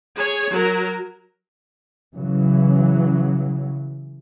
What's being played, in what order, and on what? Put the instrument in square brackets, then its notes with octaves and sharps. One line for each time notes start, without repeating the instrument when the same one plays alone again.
[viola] G#4 C#5
F#3 A#4
[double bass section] C#3 E3 F#3